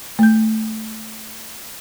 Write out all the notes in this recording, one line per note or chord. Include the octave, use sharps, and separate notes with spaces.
A3 G6